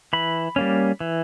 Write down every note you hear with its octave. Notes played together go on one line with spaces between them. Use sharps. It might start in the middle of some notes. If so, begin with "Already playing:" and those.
E3 B5
G3 A#3 C#4
E3